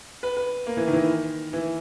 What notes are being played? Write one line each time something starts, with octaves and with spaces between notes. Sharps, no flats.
B4
B4
A#3
E3
D#3
E3
D#3
E3